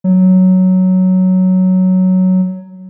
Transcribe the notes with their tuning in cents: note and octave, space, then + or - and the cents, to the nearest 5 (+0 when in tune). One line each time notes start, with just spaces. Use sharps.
F#3 +5